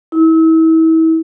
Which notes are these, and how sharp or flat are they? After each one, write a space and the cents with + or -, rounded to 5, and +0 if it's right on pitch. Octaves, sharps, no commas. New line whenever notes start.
E4 -35